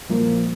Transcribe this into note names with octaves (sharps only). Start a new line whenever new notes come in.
A#2 F3 A#3